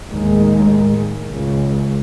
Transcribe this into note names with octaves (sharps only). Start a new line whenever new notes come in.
D#2 A2 D#3 G#3
C#2